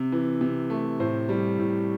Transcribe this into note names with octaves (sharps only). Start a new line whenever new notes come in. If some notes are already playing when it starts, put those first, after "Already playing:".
Already playing: C3
E3
C3
A3
A2 C5
G3
A2